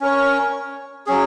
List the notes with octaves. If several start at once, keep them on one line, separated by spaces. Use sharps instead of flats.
C#4 A#4 C#5
F#3 C#4 G#4